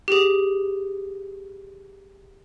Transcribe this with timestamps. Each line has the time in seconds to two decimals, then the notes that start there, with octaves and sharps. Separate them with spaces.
0.08 G4 G#4